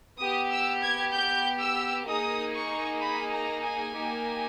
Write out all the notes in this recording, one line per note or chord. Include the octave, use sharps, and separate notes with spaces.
B3 G4 D#6
E6
G#6
G6
E6
A#3 D#4 G#4 D#6
C#6
B5
A#5
G#5
A#3 D#4 G4